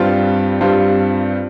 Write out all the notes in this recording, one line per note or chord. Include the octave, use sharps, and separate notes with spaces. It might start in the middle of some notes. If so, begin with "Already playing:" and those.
Already playing: G2 G3 C4 F4
G2 G3 C4 F4